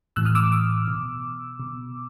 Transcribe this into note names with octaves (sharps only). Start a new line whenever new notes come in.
A2 E3 E6 F#6
D#6 F6
D6 E6
D6 E6
B2
B2